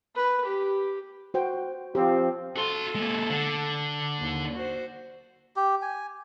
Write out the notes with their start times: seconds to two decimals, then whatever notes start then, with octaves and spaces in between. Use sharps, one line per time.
0.16 B4
0.45 G4
1.34 F#4 C5 G5
1.95 F3 C4 G4 F5
2.56 F#4 A4 C6
2.95 G#3 A#3
3.30 D3
4.20 D#2
4.54 F#4 C5
5.56 G4
5.82 G#5